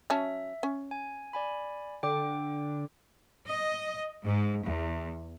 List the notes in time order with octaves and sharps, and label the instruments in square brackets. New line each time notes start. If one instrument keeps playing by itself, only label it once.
[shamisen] F#3 C#4 A5 [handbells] E5
[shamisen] C#4
[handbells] G#5
D5 G#5 B5
[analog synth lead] D3 [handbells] G5 D6
[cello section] D#5
G#2
E2